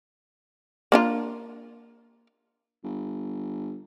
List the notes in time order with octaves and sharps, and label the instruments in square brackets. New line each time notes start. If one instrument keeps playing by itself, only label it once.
[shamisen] A#3 D4 F4
[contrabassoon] G1